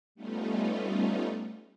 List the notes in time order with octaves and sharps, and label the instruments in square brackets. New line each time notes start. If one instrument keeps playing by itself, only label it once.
[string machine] G3 A3 B3 C#4 D#4 F4